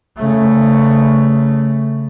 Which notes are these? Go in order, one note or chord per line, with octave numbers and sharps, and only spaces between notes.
C#3 A3